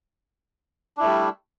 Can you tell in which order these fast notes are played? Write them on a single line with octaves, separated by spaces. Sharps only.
D4 E4 A3 G3